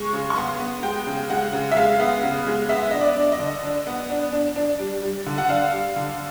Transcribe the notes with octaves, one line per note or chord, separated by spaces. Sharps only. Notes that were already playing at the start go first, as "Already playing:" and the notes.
Already playing: G#3 C#6
C#3
C#6
B3 C6
B3
G#3 G5
C#3
G#3 F#5
C#3
E5
G#3 F5
B3
C#3
G#3
B3 E5
D4 D#5
D5
D4
D#5
D3
D4
B3
D4
D4
D4
G3
G3
D3
F#5
D4 F5
G3
D3